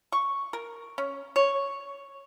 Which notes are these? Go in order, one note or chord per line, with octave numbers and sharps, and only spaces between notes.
C#6
A#4
C#4
C#5